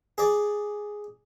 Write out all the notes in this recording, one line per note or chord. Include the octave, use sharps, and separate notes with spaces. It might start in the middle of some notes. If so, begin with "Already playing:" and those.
G#4 D5